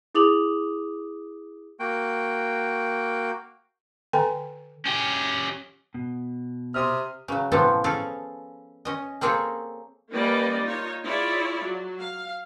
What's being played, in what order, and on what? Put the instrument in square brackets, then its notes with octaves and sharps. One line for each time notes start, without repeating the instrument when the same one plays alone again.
[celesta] E4 G#4 D6 D#6 F7 F#7
[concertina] A#3 F#4 G5
[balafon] D3 A4 G5 G#5 A#5
[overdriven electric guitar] C#4 G4
[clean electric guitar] B2
[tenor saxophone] C3 [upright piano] C6 D#6 F6
[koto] C#3 F#3
A2 C3 E3 F3 B3 A4
C#4 G#4 A4 F5
C#4 D#5
A#3 C4 G#4 A4 C#5
[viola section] G3 A#3 C#4 B4 D5 D#5
D#4 F4 C#5
E4 F4 G#4 C#5 D5 E5
F#3
F5